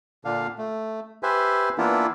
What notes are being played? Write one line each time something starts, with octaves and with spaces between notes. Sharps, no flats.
A#2 D3 D4 F5
A3
G4 B4 C5 E5 G#5
E3 A#3 B3 D4 E4 F4